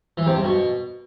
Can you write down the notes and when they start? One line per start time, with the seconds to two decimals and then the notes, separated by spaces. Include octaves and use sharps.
0.17 E3
0.26 C3
0.35 G2
0.44 B2